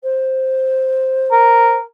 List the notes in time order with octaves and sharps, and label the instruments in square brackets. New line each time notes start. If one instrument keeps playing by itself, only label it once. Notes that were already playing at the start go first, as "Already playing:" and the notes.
[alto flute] C5
[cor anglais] A#4